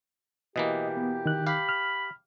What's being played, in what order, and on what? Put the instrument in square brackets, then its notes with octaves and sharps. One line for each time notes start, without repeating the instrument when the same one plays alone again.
[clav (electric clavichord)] B2 E3 A#3 [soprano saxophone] G4 [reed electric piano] D#5
[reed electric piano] B3
D#3 F#6
[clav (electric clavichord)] G4 F5 [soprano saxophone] B5
[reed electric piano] F6